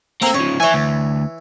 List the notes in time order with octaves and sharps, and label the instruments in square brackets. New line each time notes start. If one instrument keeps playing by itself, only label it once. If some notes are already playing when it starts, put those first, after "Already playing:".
[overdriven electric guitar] A#3 A#4 [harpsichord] C4 A4
[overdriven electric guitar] C#3 F3 [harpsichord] C#5
[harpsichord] E3 C#5 [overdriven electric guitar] E5 G#5
[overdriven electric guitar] D2